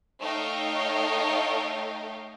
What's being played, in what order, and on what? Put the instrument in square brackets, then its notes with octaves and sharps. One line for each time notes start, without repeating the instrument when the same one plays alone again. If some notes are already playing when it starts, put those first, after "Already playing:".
[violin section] A3 D#4 C#5 D#5 F5 G5